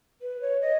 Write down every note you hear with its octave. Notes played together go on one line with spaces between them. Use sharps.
B4
C#5
D#5